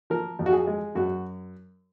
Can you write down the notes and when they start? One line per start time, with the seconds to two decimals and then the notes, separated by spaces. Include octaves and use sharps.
0.10 F3 A#4
0.39 F2
0.46 F#4
0.53 G#4
0.67 G#3
0.95 F#2 F#4